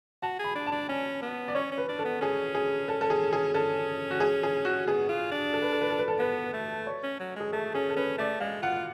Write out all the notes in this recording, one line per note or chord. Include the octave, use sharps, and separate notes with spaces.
F#4 A5
G#4 B5
D4
A5
D4
C#4 G#5
B3
D5
C#4 C#5
C#4
B4
D4
A4
B3
C#4 G#4
G#4
A4
A4
G#4
G#4
C#4 A4
F#4
G#4
G#4
F#4
B3 G#4
F4
D4
A4
B4
A4
B4
A4
B4
A4
B3 B4
A3
C#5
C#4
F#3
G#3 G#4
A3 A4
C#4 G#4
A4
C#4 B4
A3 D5
G#3 F5
F4 F#5